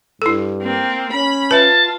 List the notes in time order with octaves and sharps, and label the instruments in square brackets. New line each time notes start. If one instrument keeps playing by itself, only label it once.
[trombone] G2 [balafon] E4 A4
[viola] A#3 C4
[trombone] C#4 [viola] B5
[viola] F4 [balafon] B4 E5 [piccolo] A5